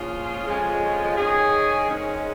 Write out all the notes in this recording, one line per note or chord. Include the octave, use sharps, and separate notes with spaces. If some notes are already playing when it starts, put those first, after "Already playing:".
Already playing: A#2 F3 C#4 F4 G#4
F2 C#3 F3 G#3 C#4
D#3 C#4 G#4
G#2 D#3 G#3 C#4